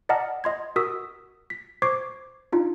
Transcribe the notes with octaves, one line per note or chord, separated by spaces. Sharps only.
D5 D#5 F#5 A5 A#5 F6
D#5 C6 G#6
F#4 A#4 D#6 E6 B6
B6
C5 C#6 D6 G#6 C7
D4 D#4 F4